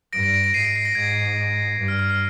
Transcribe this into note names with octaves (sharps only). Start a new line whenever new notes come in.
G2 A#6 D7
A#6 D7
A#6 D7
A#6 D7
G#2 C7 D#7
A#6 D7
C7
A#6
G#2 G#6
G2
F6
F6
F6